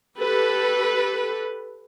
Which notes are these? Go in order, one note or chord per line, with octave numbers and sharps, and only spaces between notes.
G4 A4 B4